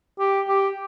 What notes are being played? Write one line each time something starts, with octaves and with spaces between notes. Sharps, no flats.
G4
G4